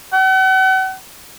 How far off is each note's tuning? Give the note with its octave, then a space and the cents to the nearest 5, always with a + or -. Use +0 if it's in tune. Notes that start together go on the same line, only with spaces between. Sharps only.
F#5 +40